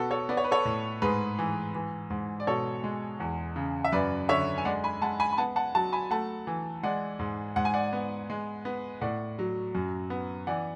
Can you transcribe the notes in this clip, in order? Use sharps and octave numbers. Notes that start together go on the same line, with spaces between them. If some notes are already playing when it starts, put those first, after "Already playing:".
Already playing: B2 B3 F#4 A4
A4 C#5
B3 D5
C#5
B4
A4 C#5
A2
G#2 G#4 B4
E3
E3
G#2
D5
B2 A4 C#5
G#3
E2
C#3
E5
F#2 B4 D5
D3 C#5 E5
G#5
G#3 D5 F#5
G#5 B5
G#3 F#5 A5
G#5 B5
B5
B3 F#5 A5
F#5 A5
F#3 F#5 A5
G#5 B5
A3 F#5 A5
E3
G#3 D5 F#5
G#2
G#2 F#5
G#5
D5 F#5
B3
G#3
B3
A2 D5 F#5
F#3
F#2
B3
E3 D5 F#5